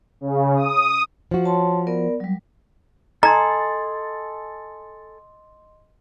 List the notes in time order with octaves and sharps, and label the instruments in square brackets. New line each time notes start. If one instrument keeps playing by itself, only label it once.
[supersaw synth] C#3
D#6
[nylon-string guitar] F3 F#4
[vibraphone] C#5 A5 C6
B3 A#4 D5
F#3 G3
[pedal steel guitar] A4 G#5 [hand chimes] D#5 C6 [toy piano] A#5